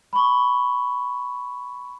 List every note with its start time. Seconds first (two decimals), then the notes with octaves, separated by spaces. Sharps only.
0.13 B5 C#6